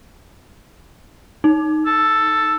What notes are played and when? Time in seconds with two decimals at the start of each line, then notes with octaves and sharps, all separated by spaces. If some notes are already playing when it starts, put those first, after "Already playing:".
1.44 D#4
1.86 A4